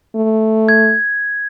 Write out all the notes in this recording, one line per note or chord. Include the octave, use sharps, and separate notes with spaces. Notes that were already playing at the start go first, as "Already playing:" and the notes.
A3
G#6